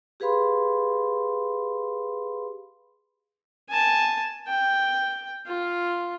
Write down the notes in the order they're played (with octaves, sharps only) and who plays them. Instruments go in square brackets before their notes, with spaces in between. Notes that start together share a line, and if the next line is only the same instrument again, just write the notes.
[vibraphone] G4 G#4 B4 F5 B5 C6
[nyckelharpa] G#5 A5
G5
F4